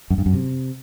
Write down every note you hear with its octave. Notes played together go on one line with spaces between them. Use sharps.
F#2
G2
F#2
C3